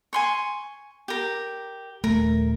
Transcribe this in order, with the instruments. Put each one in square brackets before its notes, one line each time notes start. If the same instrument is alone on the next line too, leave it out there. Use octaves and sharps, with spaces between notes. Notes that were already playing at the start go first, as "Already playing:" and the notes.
[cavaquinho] G#5 C6 C#6
G4 A#4
[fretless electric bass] D#1 A3 [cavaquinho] A#4